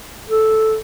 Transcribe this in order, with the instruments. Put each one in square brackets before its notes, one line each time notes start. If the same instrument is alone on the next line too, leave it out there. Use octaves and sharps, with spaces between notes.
[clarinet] A4